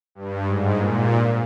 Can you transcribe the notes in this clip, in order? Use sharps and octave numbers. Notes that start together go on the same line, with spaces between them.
G2
G#2
A#2